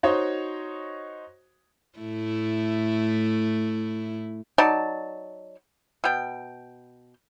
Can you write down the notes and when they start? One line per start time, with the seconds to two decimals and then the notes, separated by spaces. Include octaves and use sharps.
0.03 D#4 F#4 C5 C#5 D#5
1.99 A2 A3 E4
4.58 F#3 D#4 D5 A5
6.04 B2 G5